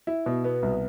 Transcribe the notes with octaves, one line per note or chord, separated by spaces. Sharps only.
E4
B2
B3
C2